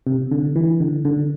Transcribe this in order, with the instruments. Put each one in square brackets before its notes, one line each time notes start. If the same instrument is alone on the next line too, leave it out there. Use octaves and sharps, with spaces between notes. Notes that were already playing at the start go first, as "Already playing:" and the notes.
[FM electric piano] C3
D3
E3
D3
D3